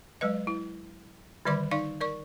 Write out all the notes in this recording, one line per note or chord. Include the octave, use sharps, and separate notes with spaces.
F#3 G#3 B4 D#5
E4
D3 D#3 G3 D5 C6 D6
D#4 D5 F5 C#6
A#4 D5 C#6